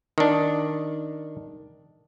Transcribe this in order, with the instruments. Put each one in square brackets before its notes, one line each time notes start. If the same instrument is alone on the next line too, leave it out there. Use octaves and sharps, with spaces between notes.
[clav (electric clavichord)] D#3 D4